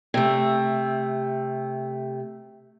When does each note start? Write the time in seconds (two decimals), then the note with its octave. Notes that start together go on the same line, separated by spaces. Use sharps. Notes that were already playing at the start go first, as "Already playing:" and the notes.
0.14 C3 A3